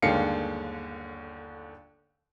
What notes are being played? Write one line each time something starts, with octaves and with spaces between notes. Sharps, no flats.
G1 D#2 D3 G#3 F5 C#7